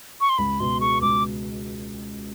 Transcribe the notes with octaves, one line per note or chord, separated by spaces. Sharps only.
C#6
C6
C#2 B5
B2 C6
G#3 C#6
C#2 D6